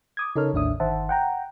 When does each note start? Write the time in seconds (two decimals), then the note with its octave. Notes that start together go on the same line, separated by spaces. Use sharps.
0.17 D6 D#6 G#6
0.36 C#3 D#4 A4 A#4 C#5 F6
0.53 A1 D#2 A2 D4 E5 D#6
0.80 G1 D#3 C5 E5 F#5 A5
1.09 F#5 G5 A#5